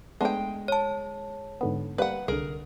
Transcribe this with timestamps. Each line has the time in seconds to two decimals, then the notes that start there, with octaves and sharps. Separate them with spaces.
0.21 G#3 A3 B3 D4 G5
0.68 C#5 A5
1.61 G#2 D3 B3
1.98 G3 A#3 B4 F#5
2.28 C2 D3 G#4 A#4